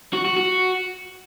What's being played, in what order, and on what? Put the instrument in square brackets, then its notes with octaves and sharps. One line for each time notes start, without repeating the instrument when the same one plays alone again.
[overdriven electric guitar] F#4
F#4
F#4